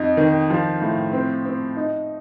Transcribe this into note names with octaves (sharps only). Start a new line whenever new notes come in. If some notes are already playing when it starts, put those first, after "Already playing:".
Already playing: F2 D#4
D#3
F3
A2
C4
C4
D#4